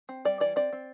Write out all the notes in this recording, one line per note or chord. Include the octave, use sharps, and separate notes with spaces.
C4
G3 D5
E3 D5
C4 D5
C4